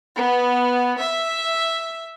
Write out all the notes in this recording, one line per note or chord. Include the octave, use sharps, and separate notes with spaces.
B3
E5